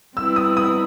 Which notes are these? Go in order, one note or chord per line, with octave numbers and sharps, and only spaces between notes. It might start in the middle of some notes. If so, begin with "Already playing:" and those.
G3 C4 E4 B4 E6
D#6
D#6